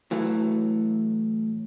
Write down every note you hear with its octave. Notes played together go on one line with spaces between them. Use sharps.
A2 E3 F#3 A3